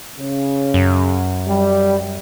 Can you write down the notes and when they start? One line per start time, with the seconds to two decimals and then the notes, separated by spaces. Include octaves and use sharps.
0.19 C#3
0.74 F#2
1.48 G3